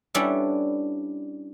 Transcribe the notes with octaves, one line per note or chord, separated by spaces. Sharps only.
G3 B3 C#4 D4 E4 A4